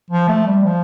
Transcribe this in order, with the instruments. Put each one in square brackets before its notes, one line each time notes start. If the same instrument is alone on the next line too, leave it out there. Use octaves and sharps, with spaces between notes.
[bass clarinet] F3
A3
G3
F3